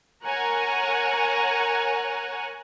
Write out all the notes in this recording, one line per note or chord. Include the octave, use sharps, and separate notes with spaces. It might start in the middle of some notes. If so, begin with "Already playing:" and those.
A#4 C#5 F#5 G#5 A#5